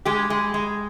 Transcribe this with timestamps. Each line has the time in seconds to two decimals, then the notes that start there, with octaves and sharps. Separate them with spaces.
0.05 G#3 G4
0.30 G#3
0.54 G#3